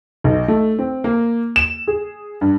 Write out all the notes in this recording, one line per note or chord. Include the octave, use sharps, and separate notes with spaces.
B1
A3
C4
A#3
E7
G#4
G2